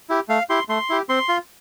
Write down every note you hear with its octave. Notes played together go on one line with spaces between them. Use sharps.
E4 G4
A3 F5
E4 G4 C6
A3 C6
E4 G4
C4 C6
F4